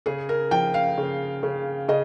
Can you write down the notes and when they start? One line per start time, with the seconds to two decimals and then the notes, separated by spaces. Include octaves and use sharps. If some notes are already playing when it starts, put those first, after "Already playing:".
0.06 C#3 G#4
0.29 A#4
0.51 F3 G5
0.74 F5
0.98 C#3
1.43 C#3
1.88 C#3 D#5